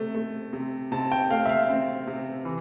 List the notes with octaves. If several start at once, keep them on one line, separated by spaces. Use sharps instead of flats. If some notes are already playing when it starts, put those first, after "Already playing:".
Already playing: C3 A3
A3
C3
C3 A5
G5
A3 F5
E5
F5
C4
C3
E3